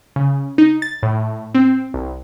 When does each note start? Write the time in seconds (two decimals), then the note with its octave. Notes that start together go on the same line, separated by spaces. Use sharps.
0.16 C#3
0.58 D#4
0.82 A6
1.03 A2
1.55 C4
1.94 C2